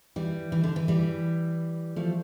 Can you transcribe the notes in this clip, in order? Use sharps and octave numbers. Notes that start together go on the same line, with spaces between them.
E3 G3
E3
D3
E3
E3 G3
F3 A3